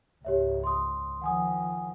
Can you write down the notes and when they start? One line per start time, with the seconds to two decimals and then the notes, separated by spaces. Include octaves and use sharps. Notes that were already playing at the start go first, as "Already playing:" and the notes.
0.25 C#2 G#2 G4 C#5 E5
0.64 C6 D#6
1.22 D#3 F3 F#5 G#5 D#6